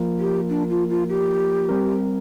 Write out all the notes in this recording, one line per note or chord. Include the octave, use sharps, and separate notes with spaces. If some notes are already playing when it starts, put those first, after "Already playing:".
Already playing: F3 A#3 F4 A#4
G4
D4
F4
F4
G4
G3 C4 A#4